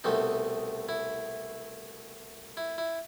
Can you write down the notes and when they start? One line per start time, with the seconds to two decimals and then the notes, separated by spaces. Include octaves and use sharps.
0.04 C2 B2 A3 C4 D#4
0.89 E4
2.57 E4
2.78 E4